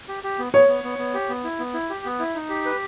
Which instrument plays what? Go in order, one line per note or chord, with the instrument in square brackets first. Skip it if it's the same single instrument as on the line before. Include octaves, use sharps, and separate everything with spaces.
[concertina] G4
G4
B3
[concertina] B3 [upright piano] C#5
[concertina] B3
B3
B3
G4
B3
E4
B3
E4
G4
B3
E4
D#4
G4
B4